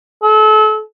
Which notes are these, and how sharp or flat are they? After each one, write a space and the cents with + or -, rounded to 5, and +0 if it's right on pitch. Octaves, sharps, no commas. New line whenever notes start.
A4 -35